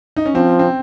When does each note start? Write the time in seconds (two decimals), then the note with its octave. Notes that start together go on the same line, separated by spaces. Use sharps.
0.16 D#4
0.26 C#4
0.34 F3 C4
0.59 C4